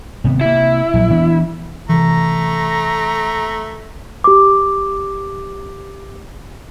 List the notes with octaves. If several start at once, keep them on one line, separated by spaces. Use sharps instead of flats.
G#1 C3 B3
C3 A#3 E4
A#1 F#3
E3 B3 D4
C3 E3 A3 A#5
G4 D6